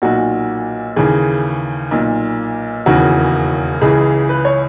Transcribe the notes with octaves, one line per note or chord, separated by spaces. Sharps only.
B1 A#2 F#4
D#2 C#3 E3 G#4
B1 A#2
E1 D#2 C#3 E3 F#4
C#2 C#3 E3 G#4
B4
C#5